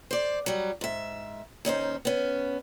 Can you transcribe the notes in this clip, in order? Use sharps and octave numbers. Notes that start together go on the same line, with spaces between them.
C5 D5
F#3 G3
G#2 E5
D#2 C#4 D#4 C5
B3 C#4